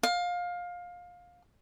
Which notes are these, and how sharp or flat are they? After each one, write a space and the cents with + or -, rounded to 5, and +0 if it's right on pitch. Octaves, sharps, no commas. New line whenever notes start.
F5 +20